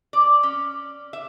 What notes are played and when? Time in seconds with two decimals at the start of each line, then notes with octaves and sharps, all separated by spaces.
0.13 D5
0.43 C#4
1.13 E5